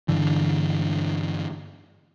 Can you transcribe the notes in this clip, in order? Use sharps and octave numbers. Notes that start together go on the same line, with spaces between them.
G2 D3 E3